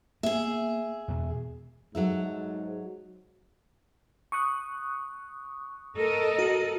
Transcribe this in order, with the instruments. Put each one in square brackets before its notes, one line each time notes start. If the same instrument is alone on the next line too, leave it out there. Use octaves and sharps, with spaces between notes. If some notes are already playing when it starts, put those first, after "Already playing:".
[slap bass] A#3 B3 [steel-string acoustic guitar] G#4 E5
[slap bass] E2 B2
[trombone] G#2 [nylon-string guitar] F#3 A4 E5
[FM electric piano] C#6 D#6 F#6
[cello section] A4 A#4 D#5
[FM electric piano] F#4